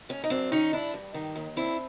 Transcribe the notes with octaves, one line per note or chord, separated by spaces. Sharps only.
D#2 C#4
D#4
F#2 C4 D4
D#3 C#4 D#4
G2 D4 E4
G2
D#3
D#2
C4 D4 E4